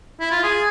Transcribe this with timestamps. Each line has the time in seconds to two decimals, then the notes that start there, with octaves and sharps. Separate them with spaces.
0.21 E4
0.31 F4
0.44 G#4